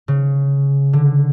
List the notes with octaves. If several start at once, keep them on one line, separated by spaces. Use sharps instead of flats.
C#3
D3